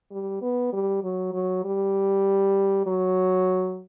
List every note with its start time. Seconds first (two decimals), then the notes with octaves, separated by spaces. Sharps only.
0.11 G3
0.42 B3
0.73 G3
1.03 F#3
1.33 F#3
1.64 G3
2.86 F#3